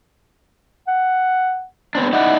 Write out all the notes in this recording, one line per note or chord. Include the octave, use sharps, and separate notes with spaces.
F#5
B3 C4 D4
D#4 E4 D5 F#5